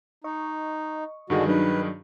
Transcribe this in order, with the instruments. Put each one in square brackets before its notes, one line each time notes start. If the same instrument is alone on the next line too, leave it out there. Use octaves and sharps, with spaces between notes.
[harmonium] D#4 [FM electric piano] D#5 C#6
[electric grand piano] G2 D#3 G#4 [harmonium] D3 G#3 F#4
[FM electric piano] F#3 D4 D#4 [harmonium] B4